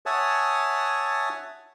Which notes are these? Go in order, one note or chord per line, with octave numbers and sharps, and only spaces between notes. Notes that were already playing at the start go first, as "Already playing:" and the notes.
C#5 E5 F#5 G#5 A5 D#6